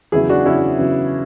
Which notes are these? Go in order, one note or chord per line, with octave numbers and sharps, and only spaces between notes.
E2 C#3 F#3 E4 G#4
D4 F#4
E2 C#3 F#3 C#4 E4
E2 C#3 F#3